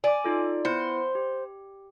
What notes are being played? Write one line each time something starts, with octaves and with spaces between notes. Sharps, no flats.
D5 G#5 D6
D#4 F4 A4
B3 E4 C5 C#7
G4